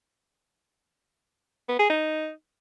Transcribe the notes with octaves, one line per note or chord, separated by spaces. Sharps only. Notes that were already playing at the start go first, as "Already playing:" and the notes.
B3
G#4
D#4